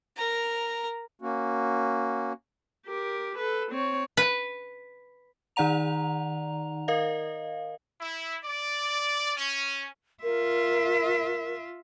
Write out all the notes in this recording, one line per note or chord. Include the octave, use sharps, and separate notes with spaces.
A#4 A#5
A#3 C#4 F#4
G4 A#4
A4 B4
C4 C#5
B4
D#3 D#4 D5 F#5 A#5 F7
A#4 D#5 F5
E4
D5
C#4
F4 A#4 E5